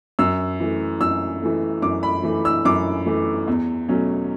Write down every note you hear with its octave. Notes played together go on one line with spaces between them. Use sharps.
F#2 E6
E3 A3
F#2 E6
E3 A3
F#2 D6
B5
E3 A3
E6
F#2 D6
E3 A3
E2
B2 F#3 A3 C#4